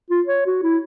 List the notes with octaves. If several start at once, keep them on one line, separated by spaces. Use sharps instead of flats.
F4
C#5
F#4
E4